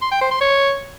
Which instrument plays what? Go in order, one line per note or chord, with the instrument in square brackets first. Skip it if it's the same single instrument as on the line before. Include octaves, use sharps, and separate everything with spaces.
[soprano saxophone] C6
G5
C5
C6
C#5